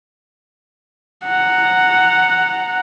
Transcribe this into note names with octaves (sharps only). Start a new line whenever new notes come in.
F#5 A#5